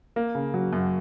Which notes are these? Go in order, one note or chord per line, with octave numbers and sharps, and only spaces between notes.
A#3
C#3
F#3
F#2